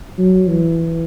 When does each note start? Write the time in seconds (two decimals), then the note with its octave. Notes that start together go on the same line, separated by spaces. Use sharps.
0.18 F#3
0.48 E3